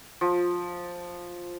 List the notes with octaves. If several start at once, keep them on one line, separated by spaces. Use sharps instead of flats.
F3